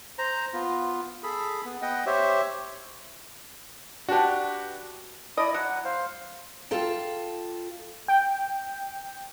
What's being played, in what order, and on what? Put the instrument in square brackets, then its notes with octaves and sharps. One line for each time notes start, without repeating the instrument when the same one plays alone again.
[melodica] C5 A#5
B3 F4
G#4 A4 B5
B3
B3 D#5 F#5 G5
G4 C5 C#5 E5
[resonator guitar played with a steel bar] D4 B4 [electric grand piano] F#4 G4
[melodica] E4 [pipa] D5 D#5
[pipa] F#3 [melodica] F#5
[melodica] F#5
C5 F5
[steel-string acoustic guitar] F4 A4 G5 A5
[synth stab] G5